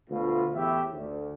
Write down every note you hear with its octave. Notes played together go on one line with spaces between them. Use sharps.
D2 B2 A3 F4
E2 A2 G4 E5
D2